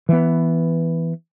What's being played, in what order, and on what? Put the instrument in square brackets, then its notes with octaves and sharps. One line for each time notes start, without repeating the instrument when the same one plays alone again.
[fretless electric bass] E3 B3